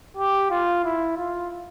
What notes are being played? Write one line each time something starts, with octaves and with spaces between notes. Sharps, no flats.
G4
F4
E4
F4